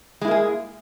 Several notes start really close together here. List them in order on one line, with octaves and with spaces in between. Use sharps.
G#3 E4 A#3 G#4